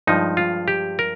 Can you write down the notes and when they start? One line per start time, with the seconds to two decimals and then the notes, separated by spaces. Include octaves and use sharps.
0.07 G2 F3 G#3 D#4
0.37 F4
0.68 G4
0.99 A#4